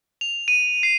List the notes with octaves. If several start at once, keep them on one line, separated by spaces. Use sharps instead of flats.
F7
D#7
C7